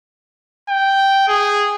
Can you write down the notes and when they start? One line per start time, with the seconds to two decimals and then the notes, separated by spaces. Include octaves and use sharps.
0.69 G5
1.28 G#4